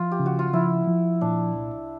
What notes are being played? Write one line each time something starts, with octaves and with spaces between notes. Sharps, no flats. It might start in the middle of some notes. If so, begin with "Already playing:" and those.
Already playing: F3 F4
G4
C#3
F#4
F4
F3 E4
F3
A#2 D4
C2